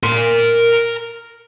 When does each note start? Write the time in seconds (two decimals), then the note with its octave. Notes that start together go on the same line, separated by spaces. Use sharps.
0.03 A#4 C6